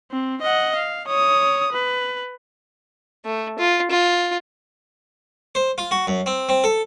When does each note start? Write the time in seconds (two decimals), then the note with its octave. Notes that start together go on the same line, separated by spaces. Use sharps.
0.11 C4
0.41 D#5 F#5
0.76 F5
1.07 C#5 D#6
1.72 B4
3.25 A3
3.59 F4
3.91 F4
5.55 C5
5.78 F4
5.91 F#4
6.07 F#2
6.26 C4
6.49 C4
6.64 A4